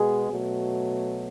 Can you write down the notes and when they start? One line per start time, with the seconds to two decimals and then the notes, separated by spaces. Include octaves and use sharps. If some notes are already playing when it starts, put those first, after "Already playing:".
Already playing: B2 G#3 B3 G#4
0.29 B2 F#3 A3